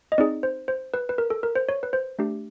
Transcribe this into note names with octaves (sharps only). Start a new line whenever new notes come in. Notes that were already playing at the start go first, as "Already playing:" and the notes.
D#5
C4 D#4 G#4 D5
C5
C5
B4
B4
A#4
A4
A#4
C5
C#5
B4
C5
A3 D4 G4